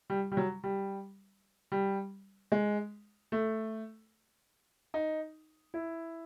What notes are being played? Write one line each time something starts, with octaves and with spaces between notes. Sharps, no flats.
G3
G3
F#3
G3
G3
G#3
A3
D#4
E4